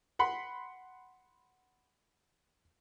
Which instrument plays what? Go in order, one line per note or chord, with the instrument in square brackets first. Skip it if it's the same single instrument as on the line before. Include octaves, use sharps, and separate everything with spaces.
[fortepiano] F#5 B5 C6